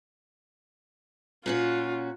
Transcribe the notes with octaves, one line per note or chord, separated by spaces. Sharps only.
A#2 C#4 F4 F#4